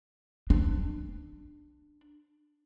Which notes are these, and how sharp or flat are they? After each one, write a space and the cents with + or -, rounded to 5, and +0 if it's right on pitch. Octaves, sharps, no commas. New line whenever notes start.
D4 +20